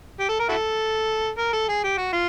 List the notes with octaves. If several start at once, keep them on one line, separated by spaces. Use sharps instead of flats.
G4
A4
A#4
E4 F#4 A4
A#4
A4
G#4
G4
F#4
F4